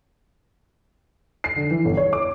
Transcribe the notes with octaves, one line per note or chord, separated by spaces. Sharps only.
C7
D3
E3
G1
C#5
D6